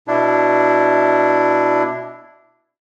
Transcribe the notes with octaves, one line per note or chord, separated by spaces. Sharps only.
B2 D4 E4